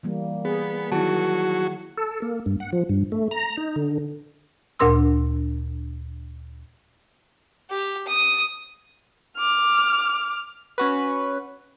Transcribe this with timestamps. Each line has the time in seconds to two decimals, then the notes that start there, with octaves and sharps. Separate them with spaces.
0.03 E3 G3 A#3
0.45 B3 G#4
0.92 D#3 F#3 E4 F#4 G#4 A5
1.97 A4
2.22 A#3
2.46 G2
2.60 F#5
2.72 F3
2.89 G2
3.12 A3
3.31 A#5
3.57 D#4
3.76 D3
4.79 D2 A#2 D4 A#4 C6 E6
7.70 G4
8.08 D#6
9.37 D6 F6
10.78 C#4 F#4 B4